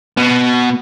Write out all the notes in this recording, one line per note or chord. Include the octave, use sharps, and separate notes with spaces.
B2